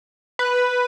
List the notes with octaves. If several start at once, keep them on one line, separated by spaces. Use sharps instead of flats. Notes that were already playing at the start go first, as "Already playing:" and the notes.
B4